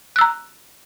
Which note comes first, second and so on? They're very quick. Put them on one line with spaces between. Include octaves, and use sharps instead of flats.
F#6 E6 A#5